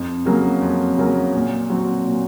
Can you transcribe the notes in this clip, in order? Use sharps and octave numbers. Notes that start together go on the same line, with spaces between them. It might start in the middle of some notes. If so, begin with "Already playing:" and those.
Already playing: F2
C#3 F#3 A#3
F2
C#3 F#3 A#3
A#2
F#3 C4 F#4
A#2